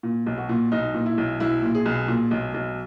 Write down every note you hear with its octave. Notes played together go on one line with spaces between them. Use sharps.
A#2
B1
F#4
A#2
B1 D#4
A#2
E4
B1
B1 E4
A#2
G#4
B1
A#2
B1
B1